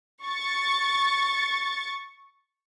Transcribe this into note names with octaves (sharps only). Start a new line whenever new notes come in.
C#6 A6